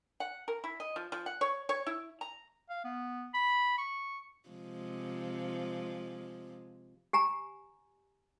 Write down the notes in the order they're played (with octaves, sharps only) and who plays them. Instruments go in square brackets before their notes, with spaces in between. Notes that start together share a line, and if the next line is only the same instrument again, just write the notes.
[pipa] F#5
A#4
E4
D#5
F3
F3
F#5
C#5
C#5
E4
A#5
[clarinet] F5
B3
B5
C#6
[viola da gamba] C3 F3 G#3
[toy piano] G4 G#5 A#5